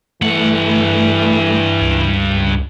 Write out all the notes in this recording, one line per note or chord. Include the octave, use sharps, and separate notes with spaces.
G2 E3 A3 F#5
C#2